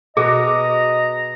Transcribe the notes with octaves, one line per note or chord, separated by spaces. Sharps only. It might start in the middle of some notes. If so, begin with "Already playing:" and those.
B2 F#4 G#4 D#5 A#5